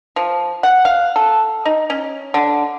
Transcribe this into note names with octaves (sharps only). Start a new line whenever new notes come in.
F3
F#5
F5
A4
D#4
C#4
D3